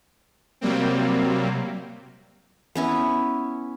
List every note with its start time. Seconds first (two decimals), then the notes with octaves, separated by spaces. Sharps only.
0.61 C3 F#3 G3 A#3 C4
2.75 B3 C#4 E4